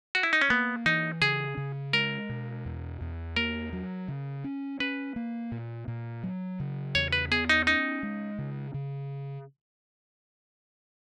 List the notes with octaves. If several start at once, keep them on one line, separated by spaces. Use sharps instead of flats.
F#4
E4
D#4
C#4
A#3 B3
E3 D#4
C#3 G#4
C#3
G#3 A#4
B2
E2
E2
A#3 A#4
F#3
C#3
C#4
C#4 B4
A#3
A#2
A#2
F#3
C#3
E2 C#5
B4
B3 G#4
D#4
C#4 D#4
G#3
C#3
C#3